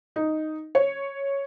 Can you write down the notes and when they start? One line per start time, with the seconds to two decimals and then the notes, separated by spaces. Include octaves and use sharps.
0.16 D#4
0.75 C#5